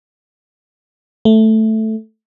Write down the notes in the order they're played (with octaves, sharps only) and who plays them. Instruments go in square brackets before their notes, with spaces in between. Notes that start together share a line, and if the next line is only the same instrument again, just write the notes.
[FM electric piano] A3